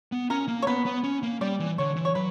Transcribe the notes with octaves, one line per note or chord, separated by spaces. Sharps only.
B3
C#4 A#4
A#3
C#5
B3 B4
B3
C#4
A#3
G3 D5
E3
D3 C#5
E3
C#5
F#3 B4